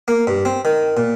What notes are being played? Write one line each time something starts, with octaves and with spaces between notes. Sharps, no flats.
A#3
G2
C4
D#3
A#2